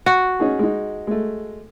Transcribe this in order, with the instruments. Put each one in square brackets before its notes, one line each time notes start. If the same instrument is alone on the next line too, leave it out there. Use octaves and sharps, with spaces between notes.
[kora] F#4
[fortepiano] C#4 D#4 G#4
G#3 D#4
G#3 A3